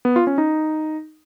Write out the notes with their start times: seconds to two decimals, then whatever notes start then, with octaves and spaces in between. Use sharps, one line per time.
0.05 B3
0.16 F4
0.27 C#4
0.38 D#4